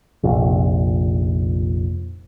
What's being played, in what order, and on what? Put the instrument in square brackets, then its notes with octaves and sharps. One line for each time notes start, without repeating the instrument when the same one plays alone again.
[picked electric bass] F1 A#1